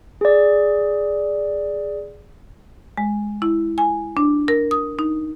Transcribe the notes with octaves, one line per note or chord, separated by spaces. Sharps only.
G#4 D5
G#3
E4
G#5
D4
A#4
D#6
D#4